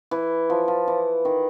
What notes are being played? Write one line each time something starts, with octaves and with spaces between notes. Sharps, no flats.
E3
F3
F3
E3
D#3